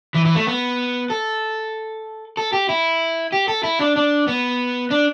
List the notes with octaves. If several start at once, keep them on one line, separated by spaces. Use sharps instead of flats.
E3
E3
A3
B3
A4
A4
G4
E4
G4
A4
E4
D4
D4
B3
D4